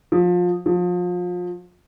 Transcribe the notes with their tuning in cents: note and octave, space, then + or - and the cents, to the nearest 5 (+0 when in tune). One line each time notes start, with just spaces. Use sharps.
F3 +25
F3 +30